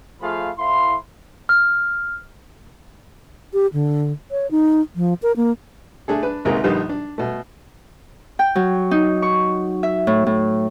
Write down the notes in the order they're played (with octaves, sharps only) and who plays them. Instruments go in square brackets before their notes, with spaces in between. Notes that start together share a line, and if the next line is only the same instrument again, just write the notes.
[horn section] F3 A3 F4 G#4 F5 B5
A2 E4 F5 C6
[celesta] F6
[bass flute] G4
D3
C#5
D#4
F3
A#4
A#3
[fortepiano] A3 D4 G#4 A4
D4 B4
G#1 C#2 C3 A#3 G#4 A#5
A#1 D3 G3 D#4 G4 B4
D4
B2 A3
[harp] G5
F#3
D#4
C#6
E5
A2
A2